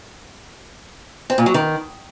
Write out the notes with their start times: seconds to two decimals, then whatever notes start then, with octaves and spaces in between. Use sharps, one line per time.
1.30 C4
1.38 A#2
1.46 F#3
1.54 D#3